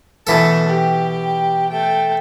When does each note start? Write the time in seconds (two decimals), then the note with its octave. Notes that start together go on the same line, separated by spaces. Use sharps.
0.27 B2 E3 A3 A4 A5
0.68 G4 G5
1.69 A3 G5